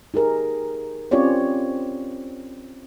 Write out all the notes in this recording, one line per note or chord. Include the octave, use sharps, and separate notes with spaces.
D#4 G4 G#4 A#4
C4 C#4 F4 G4 C#5 D5